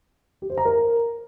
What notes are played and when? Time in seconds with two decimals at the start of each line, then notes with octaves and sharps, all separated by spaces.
0.42 G4
0.50 C5
0.58 A#5
0.65 A#4